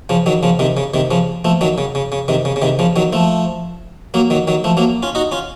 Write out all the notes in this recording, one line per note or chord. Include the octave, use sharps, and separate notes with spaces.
C#3 F3
D#3 F#3
C#3 F3
C3 D#3
C#3
C3 D#3
C#3 F3
F3 A3
D#3 F#3
C#3
C#3
C#3
C3 D#3
C#3
C#3
C3 D#3
C#3 F3
D#3 F#3
F3 A3
F#3 A#3
D#3 F#3
D#3 F#3
F3 A3
F#3 A#3
C#4 F4
D#4 F#4
C#4 F4